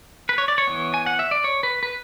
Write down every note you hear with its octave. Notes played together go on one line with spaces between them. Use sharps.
B4
C#5
D5
C#5
E3 B3
G#5
F#5
E5
D5
C#5
B4
B4